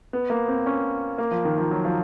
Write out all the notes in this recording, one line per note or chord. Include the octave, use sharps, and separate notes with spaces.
B3
A#3
C4
C#4
A#3
F3
D#3
F3
F#3
F3